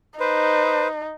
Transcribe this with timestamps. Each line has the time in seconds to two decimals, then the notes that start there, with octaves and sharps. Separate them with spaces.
0.20 D#4 B4 C5